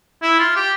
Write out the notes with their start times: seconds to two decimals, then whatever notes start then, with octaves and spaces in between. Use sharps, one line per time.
0.22 E4
0.39 F4
0.56 G4